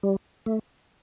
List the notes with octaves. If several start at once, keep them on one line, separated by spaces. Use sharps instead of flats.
G3
A3